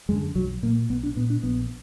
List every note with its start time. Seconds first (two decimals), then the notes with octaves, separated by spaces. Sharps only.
0.09 F#2 G#3
0.12 D3
0.35 B1 F#3
0.63 A#2 A#3
0.90 B1 B3
1.03 D4
1.16 A#2 B3
1.30 D4
1.43 A#1 B3